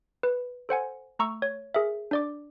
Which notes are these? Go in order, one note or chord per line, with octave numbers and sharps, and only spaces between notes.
B4
A4 C5 F#5 G#5
A3 A#5 C#6 E6
C#5
G#4 A#4 E5
D4 D5 D6